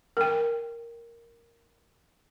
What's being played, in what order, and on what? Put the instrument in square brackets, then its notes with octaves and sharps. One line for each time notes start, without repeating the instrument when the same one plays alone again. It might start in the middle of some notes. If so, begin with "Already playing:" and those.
[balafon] A#4 G5